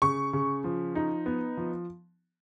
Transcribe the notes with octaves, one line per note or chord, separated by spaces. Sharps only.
C#3 C#6
C#3
F3
D#4
B3
F3